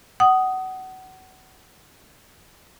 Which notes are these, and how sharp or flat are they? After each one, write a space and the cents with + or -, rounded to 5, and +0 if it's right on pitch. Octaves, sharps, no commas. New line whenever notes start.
F#5 +25 D#6 +0